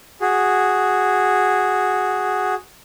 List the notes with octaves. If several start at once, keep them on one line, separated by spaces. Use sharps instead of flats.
F#4 G#4